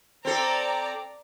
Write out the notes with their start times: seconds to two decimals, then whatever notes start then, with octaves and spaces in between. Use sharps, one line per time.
0.25 C4 A4 D5 A#5